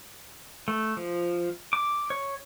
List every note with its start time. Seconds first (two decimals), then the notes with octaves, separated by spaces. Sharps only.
0.68 A3
0.97 F3
1.73 D6
2.10 C#5